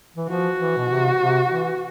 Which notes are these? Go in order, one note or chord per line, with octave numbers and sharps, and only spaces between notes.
E3
F3 F#4
E3
B2
C3
C3
E3